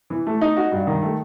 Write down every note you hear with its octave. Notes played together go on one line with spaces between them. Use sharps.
E3
A3
D#4
F#4
G2
D#3
A3